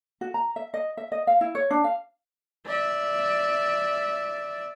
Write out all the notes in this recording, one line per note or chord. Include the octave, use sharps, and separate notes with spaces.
F#4
A#5
E5
D#5
E5
D#5
F5
E4
C#5
D4
F5
D5 E5